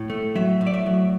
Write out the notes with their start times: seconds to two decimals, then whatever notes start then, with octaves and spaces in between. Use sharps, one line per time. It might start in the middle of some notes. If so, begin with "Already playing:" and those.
Already playing: A2
0.10 A3
0.35 F#3 E5
0.61 A2
0.67 D5
0.74 E5
0.86 F#3